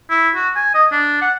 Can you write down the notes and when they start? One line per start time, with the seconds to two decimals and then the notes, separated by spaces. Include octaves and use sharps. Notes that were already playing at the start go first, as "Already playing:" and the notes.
0.10 E4
0.35 F#4
0.55 G#5
0.74 D#5
0.92 D4
1.22 F#5